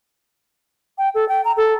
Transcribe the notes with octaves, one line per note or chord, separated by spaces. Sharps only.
G5
A4
G5
A#5
A4